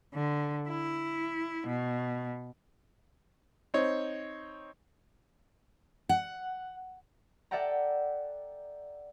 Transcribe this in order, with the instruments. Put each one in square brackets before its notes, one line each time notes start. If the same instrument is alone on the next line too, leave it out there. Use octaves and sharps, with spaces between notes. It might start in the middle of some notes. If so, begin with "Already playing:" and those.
[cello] D3
E4
B2
[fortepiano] C4 D#4 C#5
[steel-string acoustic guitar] F#5
[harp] A4 D5 E5 F#5 G5 A#5